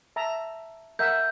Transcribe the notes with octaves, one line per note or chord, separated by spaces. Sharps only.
E5 A5 A#5
A#4 E5 F#5 G6